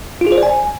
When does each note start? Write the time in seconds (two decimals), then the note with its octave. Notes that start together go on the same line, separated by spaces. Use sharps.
0.21 F4
0.27 G#4
0.32 C5
0.37 D5
0.43 G#5